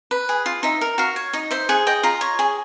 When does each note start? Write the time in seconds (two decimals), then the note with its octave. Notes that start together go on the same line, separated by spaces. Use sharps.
0.11 B4
0.29 G#4
0.46 F4
0.63 D#4 E5
0.81 A#4
0.98 F#4 F5
1.16 C#5
1.33 D#4 D#5
1.51 C5 E5
1.69 G#4 F#5
1.87 D#5 G5
2.03 F4 A#5
2.21 C#5
2.39 G#4